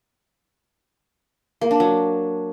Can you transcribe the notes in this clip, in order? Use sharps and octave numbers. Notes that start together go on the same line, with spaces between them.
A#3
D4
F#3